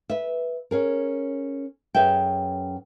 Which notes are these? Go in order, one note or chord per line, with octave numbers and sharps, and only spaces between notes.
B4 E5
C#4 G#4 A#4
F#2 C#4 G#4 B4 E5 G5